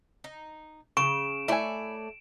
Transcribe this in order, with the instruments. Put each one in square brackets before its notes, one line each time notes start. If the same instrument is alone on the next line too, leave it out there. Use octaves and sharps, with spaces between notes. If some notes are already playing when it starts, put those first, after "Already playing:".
[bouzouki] D#4
[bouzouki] C#3 [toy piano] C#6 [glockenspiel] D7 E7
[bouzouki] A3 C#5 D5 [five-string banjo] E4 G#5